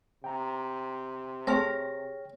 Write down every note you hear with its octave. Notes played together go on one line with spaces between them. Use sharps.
C3 G5 A#5
A3 C4 G#4 C5 C#5 G5 F6 A#6